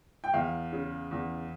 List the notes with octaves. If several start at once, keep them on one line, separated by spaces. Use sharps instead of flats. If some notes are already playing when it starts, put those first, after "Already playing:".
G5
E2 F5
C#3
E2